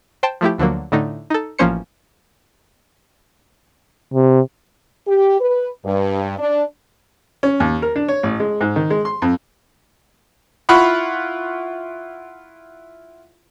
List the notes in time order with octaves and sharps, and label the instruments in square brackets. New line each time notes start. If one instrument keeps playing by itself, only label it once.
[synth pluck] C5 G5 A5
F3 A3 E4 G4
D2 D3 F3 F#3 A#3
A2 D3 A3 D#4
D#4 A4
A1 F3 A#3 C#4 C5 C#7
[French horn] C3
[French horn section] G4
B4
G2
D4
[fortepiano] C#4
D#2
A#4
D4
C#5
A1
G#3
G#2
D#3
G#3
C6
F2
E4 F4 F#5 B5 C#6